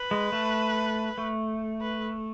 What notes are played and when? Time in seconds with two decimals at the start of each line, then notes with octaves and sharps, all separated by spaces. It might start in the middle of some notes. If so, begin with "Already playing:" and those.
Already playing: B4
0.11 G#3
0.32 A3
1.18 A3
1.81 B4